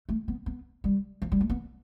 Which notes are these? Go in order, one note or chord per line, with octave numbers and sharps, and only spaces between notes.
A3
B3
B3
G3
F3
G3
A3
B3